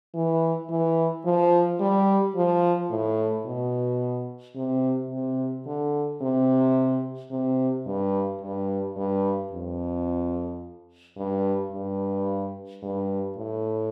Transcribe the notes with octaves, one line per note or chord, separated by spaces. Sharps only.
E3
E3
F3
G3
F3
A2
B2
C3
C3
D3
C3
C3
G2
G2
G2
F2
G2
G2
G2
A2